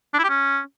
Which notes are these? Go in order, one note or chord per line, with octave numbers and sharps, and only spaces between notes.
D4
E4
G4
C#4